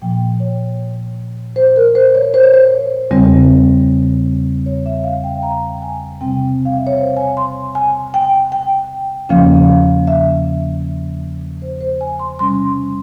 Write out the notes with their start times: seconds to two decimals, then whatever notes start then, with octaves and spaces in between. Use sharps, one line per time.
0.02 A#2 F3 A#3 G5
0.40 C#5
1.56 C5
1.76 A#4
1.95 C5
2.15 C#5
2.34 C5
2.43 C#5
2.54 C5
3.11 E2 C#3 G3 C4
4.66 C#5
4.86 E5
5.04 F5
5.24 G5
5.43 A#5
5.82 G#5
6.21 C3 G3 C4 G5
6.65 F5
6.77 E5
6.87 C#5
6.98 C5
7.17 G#5
7.37 C6
7.75 G#5
8.14 G5
8.52 G5
9.29 E2 C#3 F3 A#3 C#4 F5
10.07 E5
11.62 C5
11.81 C5
12.01 G#5
12.19 C6
12.39 C3 G3 C#4 C6
12.65 C6